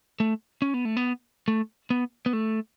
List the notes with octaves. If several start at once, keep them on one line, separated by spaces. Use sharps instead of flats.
A3
C#4
B3
A3
B3
A3
B3
B3
A3